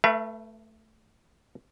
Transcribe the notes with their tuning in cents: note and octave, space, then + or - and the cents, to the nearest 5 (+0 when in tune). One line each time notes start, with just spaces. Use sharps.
A3 +0 B4 -25 E5 +45